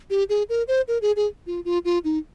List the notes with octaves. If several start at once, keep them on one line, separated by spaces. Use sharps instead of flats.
G4
G#4
A#4
C5
A#4
G#4
G#4
F4
F4
F4
D#4